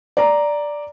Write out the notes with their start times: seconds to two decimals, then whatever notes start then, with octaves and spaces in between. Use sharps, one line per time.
0.17 D5 A#5